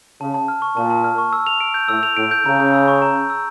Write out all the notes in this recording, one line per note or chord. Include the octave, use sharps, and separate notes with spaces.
C#3 A5
A5
F6
C#6
A#2 A5
A5
F6
C#6
E6
F7
D7
G6
A2 E6
F7
A2 D7
G6
C#3 A#5
G6
E6
C#6
A#5
G6
E6